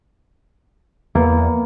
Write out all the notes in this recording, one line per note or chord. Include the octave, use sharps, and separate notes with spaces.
E2 A#3 B3